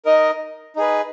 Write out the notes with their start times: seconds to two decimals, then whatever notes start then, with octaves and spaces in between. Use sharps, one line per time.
0.05 D#4 A#4 D#5
0.76 D#4 G#4 B4